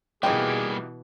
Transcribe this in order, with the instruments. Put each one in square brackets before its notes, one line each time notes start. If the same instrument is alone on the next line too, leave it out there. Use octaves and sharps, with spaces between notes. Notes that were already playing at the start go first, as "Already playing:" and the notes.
[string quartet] B2 E3 [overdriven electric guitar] G3 A#3 [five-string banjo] D#4 F4 G4 [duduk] G#4